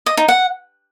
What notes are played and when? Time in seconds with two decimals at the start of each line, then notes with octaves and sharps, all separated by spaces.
0.06 D#5
0.17 D#4
0.28 F#5